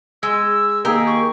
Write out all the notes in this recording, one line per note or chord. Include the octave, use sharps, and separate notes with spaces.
G#3 E6
D#3 A#3 G4 G#4 A#4
C#6